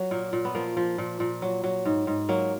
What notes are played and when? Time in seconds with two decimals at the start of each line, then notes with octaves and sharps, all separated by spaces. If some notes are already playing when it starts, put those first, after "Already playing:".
Already playing: F#3
0.11 A#2 A#3
0.33 A#2
0.45 B3
0.55 F3 A#3
0.77 F3
0.98 A#2
1.20 A#2
1.42 F#3
1.63 F#3
1.85 G#2
2.07 G#2
2.29 F#3 A#3